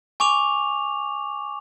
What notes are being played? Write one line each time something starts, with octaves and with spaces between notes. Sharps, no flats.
G#5 C#6 D6 F7